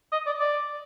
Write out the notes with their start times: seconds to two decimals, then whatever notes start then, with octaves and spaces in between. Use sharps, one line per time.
0.12 D#5
0.26 D5
0.40 D5